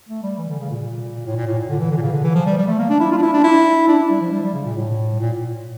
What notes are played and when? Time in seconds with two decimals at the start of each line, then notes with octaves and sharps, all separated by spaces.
0.09 A3
0.23 G3
0.38 E3
0.48 D3
0.60 C#3
0.70 A#2
0.81 A#2
1.25 A2
1.36 A#2
1.47 A2
1.58 A#2
1.69 D3
1.80 E3
1.91 D3
1.97 A#2
2.02 C#3
2.12 D3
2.24 E3
2.35 F3
2.46 G3
2.57 G3
2.67 A3
2.79 A#3
2.89 D4
3.00 E4
3.11 F4
3.17 D4
3.22 E4
3.33 D4
3.44 E4
3.88 D4
3.99 E4
4.10 G3
4.21 F3
4.32 G3
4.43 G3
4.54 C#3
4.65 A#2
4.75 A2
5.19 A#2